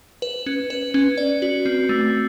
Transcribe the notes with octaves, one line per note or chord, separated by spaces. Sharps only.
B4
C#4
B4
C#4
D5
F#4
C4
A3